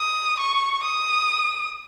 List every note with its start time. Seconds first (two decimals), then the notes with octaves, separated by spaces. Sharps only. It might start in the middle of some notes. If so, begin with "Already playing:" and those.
Already playing: D#6
0.39 C#6
0.84 D#6